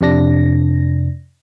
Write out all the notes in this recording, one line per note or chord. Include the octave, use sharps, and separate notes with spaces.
F2 C3 D4 A#6